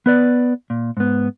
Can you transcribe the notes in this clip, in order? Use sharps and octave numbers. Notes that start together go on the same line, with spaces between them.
B3 B4 D5
A#2
G#2 B3